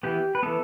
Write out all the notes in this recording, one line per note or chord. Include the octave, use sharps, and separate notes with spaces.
E3 B3 G4
B4
E3 B3 A4